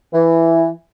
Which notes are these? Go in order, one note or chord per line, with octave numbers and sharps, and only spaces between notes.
E3